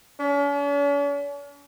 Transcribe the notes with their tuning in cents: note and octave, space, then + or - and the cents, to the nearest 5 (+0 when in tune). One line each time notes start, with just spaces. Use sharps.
C#4 +45